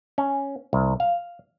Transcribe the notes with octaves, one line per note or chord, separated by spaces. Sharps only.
C#4
C2
F5